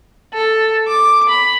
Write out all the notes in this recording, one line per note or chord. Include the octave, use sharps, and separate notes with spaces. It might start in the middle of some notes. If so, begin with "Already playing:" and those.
A4
D6
B5